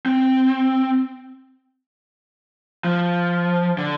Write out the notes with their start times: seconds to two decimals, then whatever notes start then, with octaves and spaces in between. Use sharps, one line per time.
0.06 C4
2.84 F3
3.78 D3